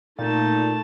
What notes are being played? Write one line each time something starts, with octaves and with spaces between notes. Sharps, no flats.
A#2 A3 D#4 A5